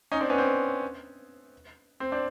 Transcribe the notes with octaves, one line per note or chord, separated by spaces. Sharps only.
C#4 D#4
C4 D4
B3 C#4
C4
C4
C4 D4